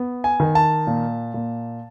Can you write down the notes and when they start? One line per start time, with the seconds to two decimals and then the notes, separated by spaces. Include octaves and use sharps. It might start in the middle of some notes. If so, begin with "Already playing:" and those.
Already playing: B3
0.24 G#5
0.40 D#3
0.55 A5
0.87 A#2
1.34 A#2